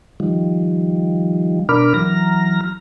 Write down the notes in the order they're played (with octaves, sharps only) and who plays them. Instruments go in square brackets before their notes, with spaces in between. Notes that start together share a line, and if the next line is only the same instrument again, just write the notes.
[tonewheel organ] D#3 F3 G3
B2 D4 A#4 B5 D6 F6
E3 F#3 A#5 F6 A#6